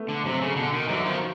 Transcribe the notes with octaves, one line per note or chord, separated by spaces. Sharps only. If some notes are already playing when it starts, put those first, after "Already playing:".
Already playing: A3 B3
D3
C3 F#3
C#3
B2 D3
D#3
D3 E3 F#3
D#3 F3